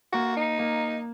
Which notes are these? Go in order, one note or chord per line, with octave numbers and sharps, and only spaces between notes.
A#3 F#4
D#4
A#3